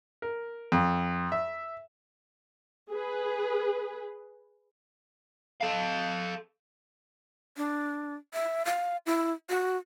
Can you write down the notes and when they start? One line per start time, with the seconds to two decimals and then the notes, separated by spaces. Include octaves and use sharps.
0.22 A#4
0.72 F2
1.32 E5
2.91 G#4 B4
5.61 A4 F5
7.57 D4
8.34 E5
8.65 F5
9.06 E4
9.49 F#4